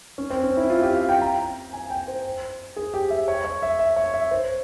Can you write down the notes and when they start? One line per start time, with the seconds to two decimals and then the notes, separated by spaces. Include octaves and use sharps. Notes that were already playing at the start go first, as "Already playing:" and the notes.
0.18 C#4
0.30 C4
0.43 C#4
0.57 E4
0.70 F4
0.83 G4
0.95 F5
1.09 G5
1.21 A#5
1.73 G#5
1.90 G5
2.08 C5
2.76 G#4
2.94 G4
3.10 E5
3.28 C#5
3.45 C#5
3.62 E5
3.79 E5
3.96 C#5
4.14 E5
4.31 C5